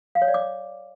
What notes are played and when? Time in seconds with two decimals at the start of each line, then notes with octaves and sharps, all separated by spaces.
0.15 F5
0.22 C#5
0.28 D5
0.34 D6